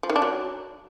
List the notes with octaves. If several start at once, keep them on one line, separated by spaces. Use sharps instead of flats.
F3
D#3
D4
F#3